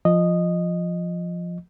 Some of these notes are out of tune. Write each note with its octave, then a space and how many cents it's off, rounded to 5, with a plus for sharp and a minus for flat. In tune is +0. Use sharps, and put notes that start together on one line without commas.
F3 +0 D#5 -10